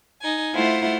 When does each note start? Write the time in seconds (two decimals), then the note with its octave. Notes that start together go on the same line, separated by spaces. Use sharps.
0.22 D#4 G#5
0.54 A3 E4 F4 C5 F#5